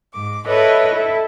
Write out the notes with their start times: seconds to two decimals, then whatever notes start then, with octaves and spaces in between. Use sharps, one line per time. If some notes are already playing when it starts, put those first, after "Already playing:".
0.13 G#2 D6
0.46 E4 A4 B4 C#5 D#5
0.93 E4 A4